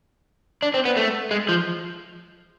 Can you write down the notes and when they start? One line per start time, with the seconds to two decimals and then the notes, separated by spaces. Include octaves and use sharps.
0.62 D4
0.74 C4
0.85 B3
0.97 A3
1.31 G#3
1.49 F3